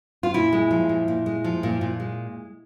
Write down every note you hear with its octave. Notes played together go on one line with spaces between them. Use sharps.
F4
A#2 E4
G#3
F3
A#2
A#2
G#3
F3
A#2
A#2
G#3